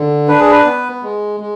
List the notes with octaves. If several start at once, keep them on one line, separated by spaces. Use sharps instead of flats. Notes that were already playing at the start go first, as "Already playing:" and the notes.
Already playing: D3
D4 B4
G#4
B4
B3
G#3
G#3